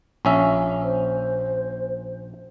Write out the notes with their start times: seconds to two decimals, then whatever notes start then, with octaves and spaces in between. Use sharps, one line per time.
0.25 A#1 C#4 E5
0.83 C5